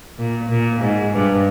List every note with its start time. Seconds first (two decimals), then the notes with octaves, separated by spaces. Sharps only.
0.18 A#2
0.49 A#2
0.80 G#2
1.13 G2